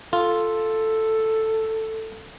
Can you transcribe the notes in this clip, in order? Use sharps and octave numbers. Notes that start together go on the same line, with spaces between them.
F4 A4